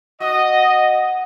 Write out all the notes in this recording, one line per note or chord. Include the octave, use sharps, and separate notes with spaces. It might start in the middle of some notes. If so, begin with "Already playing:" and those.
F#4 D#5